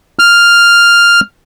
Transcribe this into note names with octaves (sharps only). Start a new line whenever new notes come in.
F6